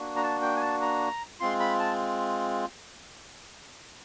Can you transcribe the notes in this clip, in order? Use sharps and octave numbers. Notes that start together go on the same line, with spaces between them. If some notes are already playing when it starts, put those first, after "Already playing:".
Already playing: A#3 D4 F#4
A#5
A5
G5
G#5
A5
A#5
G#3 C4 F4 C6
B5
A5